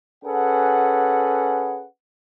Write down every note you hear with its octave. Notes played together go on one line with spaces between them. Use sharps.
C#4 G#4 A4 B4 F#5